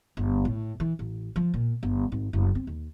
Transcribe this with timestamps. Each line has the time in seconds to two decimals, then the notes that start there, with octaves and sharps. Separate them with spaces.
0.17 G1
0.45 A2
0.80 E3
0.99 A1
1.36 F3
1.54 A#2
1.83 G1
2.12 G#1
2.33 F#1
2.55 C4
2.67 D#2